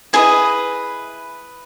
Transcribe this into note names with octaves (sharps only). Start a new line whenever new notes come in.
E4 G#4 B4 D#5 G#5